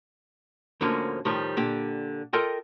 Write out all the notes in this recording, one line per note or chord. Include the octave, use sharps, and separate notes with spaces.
D2 G#2 D3 F3 A#3 C#4
A2 D#3 F3 G3
A#2 D3 G4
F4 A4 A#4 D#5 G5